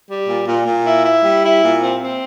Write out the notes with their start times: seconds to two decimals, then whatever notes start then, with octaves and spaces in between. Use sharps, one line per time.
0.08 G3
0.27 A#2
0.46 A#2
0.66 A#2
0.85 E4
1.05 E4
1.24 G3
1.43 E4
1.63 A#2
1.82 C4
2.01 C4